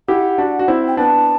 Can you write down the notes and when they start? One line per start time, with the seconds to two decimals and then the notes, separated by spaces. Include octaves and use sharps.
0.08 E4 G4 F#5
0.38 D4 F#4
0.59 F#4
0.68 C4 E4
0.87 G5
0.97 B3 D4 A5